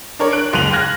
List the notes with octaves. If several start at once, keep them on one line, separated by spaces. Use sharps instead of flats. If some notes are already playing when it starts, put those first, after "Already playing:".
D4 A#4 C#5
F#6 D7
F#1 C#2 F#6 D#7 F7 F#7
F6 F#6 G#6 A#6